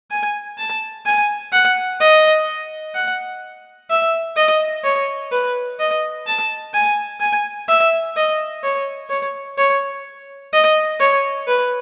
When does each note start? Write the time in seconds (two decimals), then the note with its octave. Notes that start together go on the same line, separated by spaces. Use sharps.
0.11 G#5
0.58 A5
1.06 G#5
1.53 F#5
2.00 D#5
2.95 F#5
3.90 E5
4.36 D#5
4.84 C#5
5.32 B4
5.79 D#5
6.27 A5
6.74 G#5
7.20 G#5
7.68 E5
8.16 D#5
8.63 C#5
9.10 C#5
9.58 C#5
10.53 D#5
11.00 C#5
11.47 B4